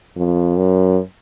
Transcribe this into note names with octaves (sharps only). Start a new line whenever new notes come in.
F2
F#2